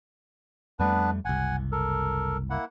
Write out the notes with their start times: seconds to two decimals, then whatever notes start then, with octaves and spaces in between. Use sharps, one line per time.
0.79 F2 G3 A3 B3 D4 B4
1.25 F#1 C2 F#5 G#5
1.72 A4 A#4
2.50 A#3 E4 F#5